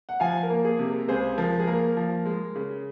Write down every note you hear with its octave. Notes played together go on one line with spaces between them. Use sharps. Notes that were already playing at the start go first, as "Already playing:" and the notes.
F#5
F3 F5 G#5
A#4
A#3
G#4
C3
A#4
C#2 G#4 C5
F3 A#4
G#4
A#3 A#4
F3
G#3
C#3